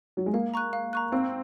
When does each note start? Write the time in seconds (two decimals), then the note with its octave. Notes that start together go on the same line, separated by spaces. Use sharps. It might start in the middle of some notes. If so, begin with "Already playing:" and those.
0.17 F#3
0.26 G#3
0.33 A#3 F5
0.54 A#5 C#6 F#6
0.73 F5
0.93 A#5 C#6 F#6
1.12 C4 F5